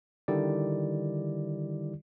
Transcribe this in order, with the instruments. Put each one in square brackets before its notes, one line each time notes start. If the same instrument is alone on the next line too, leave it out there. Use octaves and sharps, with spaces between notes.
[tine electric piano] D3 D#3 G3 E4 G4 D5